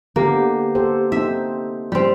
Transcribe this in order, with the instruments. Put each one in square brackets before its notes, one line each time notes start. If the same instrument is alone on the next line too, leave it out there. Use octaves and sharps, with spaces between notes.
[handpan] D3 B3 G4 [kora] A#3
[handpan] G4 A4 C5
[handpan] C4 D#4 C5 [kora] E5
[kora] G3 C4